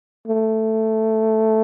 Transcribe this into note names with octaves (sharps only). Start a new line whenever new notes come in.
A3